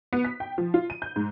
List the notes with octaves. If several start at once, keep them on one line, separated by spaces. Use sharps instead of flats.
B3
B6
G5
F3
F4
D#7
G6
G#2